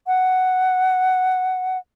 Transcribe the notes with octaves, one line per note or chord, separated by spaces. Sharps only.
F#5